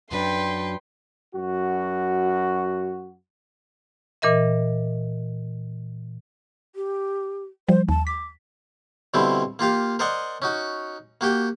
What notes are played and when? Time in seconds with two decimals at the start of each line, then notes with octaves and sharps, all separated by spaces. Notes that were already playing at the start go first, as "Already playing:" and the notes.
0.11 F#2 F#3 D4 B4 G5 C6
1.35 F#2 F#4
4.22 A#2 E3 A#4 D#5 E5
6.76 G4
7.69 F3 G3 C5
7.89 D#2 A5
8.07 D6 B6
9.14 B2 D3 G3 C4 E4
9.59 A#3 F4 G4 F5
9.99 A#4 C5 D5 D#5 F#5 G#5
10.42 C#4 D#4 F#4
11.21 A#3 F#4 G4 G5